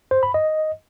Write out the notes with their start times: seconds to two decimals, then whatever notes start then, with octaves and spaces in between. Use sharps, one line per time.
0.11 C5
0.23 B5
0.34 D#5